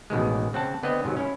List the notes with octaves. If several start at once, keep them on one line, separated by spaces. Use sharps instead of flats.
A1 B2 D#3 G#3
C#3 C4 F#5 A5
D3 B3 C4 D#5
G#2 C3 D#3 F#3
C#4 E4